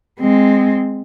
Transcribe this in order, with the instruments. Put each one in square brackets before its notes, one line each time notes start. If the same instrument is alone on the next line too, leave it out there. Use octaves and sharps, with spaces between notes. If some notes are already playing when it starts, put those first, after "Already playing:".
[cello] G#3 C4